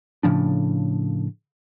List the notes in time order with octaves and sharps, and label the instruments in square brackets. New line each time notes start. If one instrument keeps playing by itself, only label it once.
[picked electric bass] A2 C#3 F3 D4